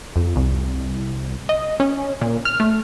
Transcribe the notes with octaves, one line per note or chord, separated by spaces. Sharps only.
F2
C2
D#5
C#4
A#2
F6
A3